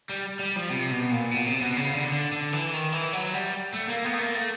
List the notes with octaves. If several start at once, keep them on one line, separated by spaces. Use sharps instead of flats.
G3
G3
F3
C3
B2
A#2
B2
C3
B2
C#3
D3
D3
D3
E3
D#3
E3
F#3
G3
A3
A#3
B3
A3
A#3
A3